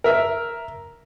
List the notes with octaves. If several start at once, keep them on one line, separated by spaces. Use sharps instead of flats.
A#4 E5